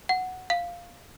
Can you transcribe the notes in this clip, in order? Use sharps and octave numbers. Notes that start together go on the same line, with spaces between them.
F#5
F5